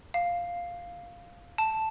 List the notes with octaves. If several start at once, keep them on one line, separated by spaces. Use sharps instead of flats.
F5
A5